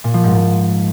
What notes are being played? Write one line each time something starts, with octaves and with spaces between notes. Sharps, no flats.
A#2
F3
G#2